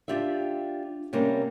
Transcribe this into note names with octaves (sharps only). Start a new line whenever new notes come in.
D4 F4 G4 D5 E5
C3 G3 A#3 C#4